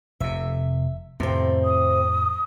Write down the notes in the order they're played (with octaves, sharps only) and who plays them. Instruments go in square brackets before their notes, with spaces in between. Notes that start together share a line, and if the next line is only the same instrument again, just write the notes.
[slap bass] F1 C3 [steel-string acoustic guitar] E5
[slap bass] F2 A2 [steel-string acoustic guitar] C3 C4
[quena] D#6